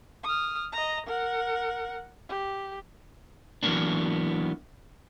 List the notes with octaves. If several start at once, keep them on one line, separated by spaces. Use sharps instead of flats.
D#6 F6
D#5 A#5
A#4 F#5
G4
E3 F#3 G#3 A#3 B3 D4